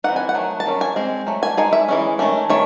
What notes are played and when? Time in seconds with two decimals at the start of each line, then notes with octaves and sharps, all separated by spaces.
0.04 E3 C4 D#4 F#5
0.16 G#5
0.29 F#5
0.34 D#3 F#3 A3
0.60 A5
0.66 D#3 F#3 C#4
0.81 G#5
0.96 G#3 C4
1.27 F#3 A3
1.43 G#5
1.57 G#3 D#4 G#5
1.73 E5
1.88 E3 G#3 C#4
2.19 D#3 A3 C#4
2.50 D#3 A3 C#5